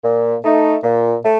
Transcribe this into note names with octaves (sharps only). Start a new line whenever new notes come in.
A#2
A3 D#4
A#2
A3